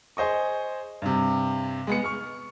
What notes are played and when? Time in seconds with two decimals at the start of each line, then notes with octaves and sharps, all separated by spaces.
0.17 G#4 C5 D#5 C#6
1.02 G2 C3
1.87 G#3 B3 C#7
2.04 C#6 F6